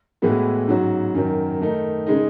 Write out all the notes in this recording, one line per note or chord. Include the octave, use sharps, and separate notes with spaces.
A2 E3 G#3 B3 F#4
G#2 F#3 C#4 F#4
F#2 D#3 F#3
D#3 A3 D#4
C#3 G#3 D#4